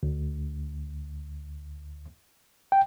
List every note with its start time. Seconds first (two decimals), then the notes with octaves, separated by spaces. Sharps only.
0.03 D2
2.72 G5